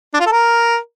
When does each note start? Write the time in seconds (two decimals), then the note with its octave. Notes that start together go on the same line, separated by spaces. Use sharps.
0.14 D4
0.20 F4
0.26 A4
0.32 A#4